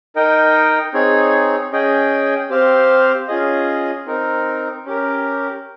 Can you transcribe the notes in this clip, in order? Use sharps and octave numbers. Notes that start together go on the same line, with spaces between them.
D#4 A#4 D#5 G5
C4 D#4 G#4 C#5
C#4 G#4 D#5 G5
C4 G4 C5 F5
C#4 F4 G#4 D#5
C4 D#4 A#4
C#4 G4 A#4